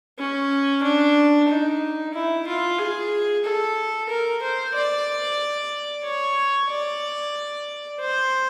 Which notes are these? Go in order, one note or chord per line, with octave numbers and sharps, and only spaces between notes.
C#4
D4
D#4
E4
F4
G#4
A4
A#4
C5
D5
C#5
D5
C5